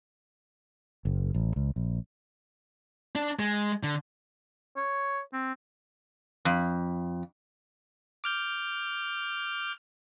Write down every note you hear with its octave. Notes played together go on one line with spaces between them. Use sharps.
F#1
A1
C#2
A#1
D4
G#3
D3
C#5
C4
F2
D6 F6 G6